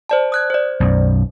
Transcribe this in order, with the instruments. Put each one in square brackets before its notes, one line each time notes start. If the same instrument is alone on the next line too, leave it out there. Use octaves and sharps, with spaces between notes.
[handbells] C5 D5 A5
D#6 F#6 G#6
C5 D5
[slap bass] B1 F#2